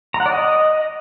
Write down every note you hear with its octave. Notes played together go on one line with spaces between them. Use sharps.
A#5
F#5
D5
D#5